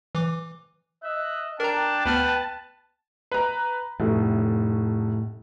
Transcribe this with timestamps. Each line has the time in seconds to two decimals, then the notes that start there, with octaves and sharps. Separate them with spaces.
0.15 E3 D6
1.04 D#5 E5 F#6
1.60 D4 A#4 G5 A5 A#5
2.05 D2 B3 B4 F6
3.32 B4 A#5
4.00 F1 A2 A3